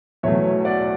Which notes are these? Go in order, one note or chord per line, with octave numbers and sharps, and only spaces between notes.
E2 B2 F#3 A3 C#5 E5
D5 F#5